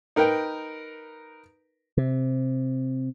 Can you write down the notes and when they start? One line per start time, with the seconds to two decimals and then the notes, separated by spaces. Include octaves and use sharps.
0.16 D#4 A#4 B4 G5
1.97 C3